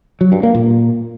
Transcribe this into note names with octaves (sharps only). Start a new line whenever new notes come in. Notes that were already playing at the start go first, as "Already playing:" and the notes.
F#3
G2
A#3
A#2